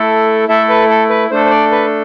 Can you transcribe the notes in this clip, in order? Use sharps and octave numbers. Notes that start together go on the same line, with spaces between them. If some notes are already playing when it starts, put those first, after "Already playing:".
Already playing: A3 E4 A4
A3 E4 A4 E5
B4
A4
B4
A3 D4 A4 C5
C5
D5
B4